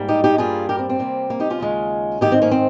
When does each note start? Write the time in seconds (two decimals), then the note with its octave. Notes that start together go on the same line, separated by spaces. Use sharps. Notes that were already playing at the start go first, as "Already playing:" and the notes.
Already playing: G#2 G3 A#3
0.08 D#4 G4
0.24 D#4 G4
0.38 G2 G3 A#3 F4 G#4
0.69 G4 A#4
0.79 C4
0.89 C4
0.99 C3 G3 A#3
1.30 A#3
1.40 D#4 G4
1.50 C#4 F4
1.60 D#2 C#3 G#3
2.21 G#2 D#3 A#3 D#4 G4
2.32 C4
2.42 A#3 C#4
2.51 C4